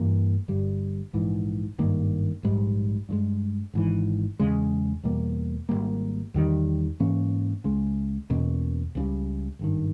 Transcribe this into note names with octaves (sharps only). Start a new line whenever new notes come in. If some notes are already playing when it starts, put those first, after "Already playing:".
Already playing: G2 E3 A#3
G1 G2 G3
A#1 G#2 E3
G#1 G2 D#3 A#3
A#1 G#2 G3
G2 D#3 G#3
G#1 G#2 E3
E2 C#3 G#3
E2 B2 G3 A#3
G#1 G#2 G3 A#3
E2 D#3 G3
G#2 E3 A#3 C#4
C#2 C#3 G#3
E2 B2 A#3 C#4
C#2 C#3 E3 G3
G#1 G2 D#3